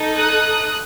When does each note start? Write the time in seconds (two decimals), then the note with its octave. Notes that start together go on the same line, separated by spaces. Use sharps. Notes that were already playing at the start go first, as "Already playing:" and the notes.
Already playing: D#4 A4
0.15 D#6 F#6